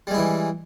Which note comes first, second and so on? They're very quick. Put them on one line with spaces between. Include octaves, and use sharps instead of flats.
G3 G#3 E4 E3